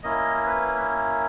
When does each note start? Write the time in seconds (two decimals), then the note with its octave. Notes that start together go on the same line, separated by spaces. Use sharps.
0.03 A#3 C#4 E4 D#5
0.46 B4